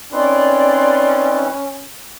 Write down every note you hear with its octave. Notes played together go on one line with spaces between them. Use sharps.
C4 C#4 D#4 B4 D5 C6